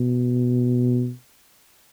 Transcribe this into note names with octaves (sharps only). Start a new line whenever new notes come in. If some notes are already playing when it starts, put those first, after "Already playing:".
Already playing: B2